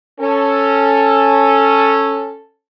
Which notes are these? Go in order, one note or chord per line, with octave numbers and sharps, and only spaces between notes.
C#4 A4